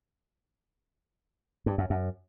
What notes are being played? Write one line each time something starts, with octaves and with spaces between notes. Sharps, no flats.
G2
F#2
F#2